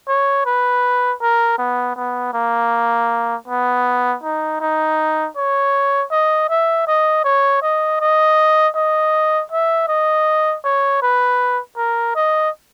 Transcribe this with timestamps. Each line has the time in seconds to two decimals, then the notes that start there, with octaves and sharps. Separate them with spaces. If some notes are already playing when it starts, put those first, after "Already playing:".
0.08 C#5
0.46 B4
1.22 A#4
1.59 B3
1.96 B3
2.34 A#3
3.48 B3
4.23 D#4
4.60 D#4
5.37 C#5
6.11 D#5
6.50 E5
6.88 D#5
7.24 C#5
7.63 D#5
8.00 D#5
8.76 D#5
9.52 E5
9.88 D#5
10.65 C#5
11.02 B4
11.77 A#4
12.16 D#5